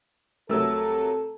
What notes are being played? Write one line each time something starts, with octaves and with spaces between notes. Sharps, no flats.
C2 C3 F#3 A3 A4 A#4 E6